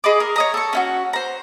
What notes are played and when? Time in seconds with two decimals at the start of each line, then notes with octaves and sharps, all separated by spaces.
0.04 G#4 D#5 B5 D6
0.20 A#4
0.36 C#5 D#5 A#5
0.54 A4 C#6
0.73 C#4 E4 F#4
1.13 C5 A#5